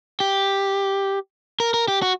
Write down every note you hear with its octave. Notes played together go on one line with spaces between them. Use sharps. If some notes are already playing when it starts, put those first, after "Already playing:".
G4
A#4
A#4
G4
F#4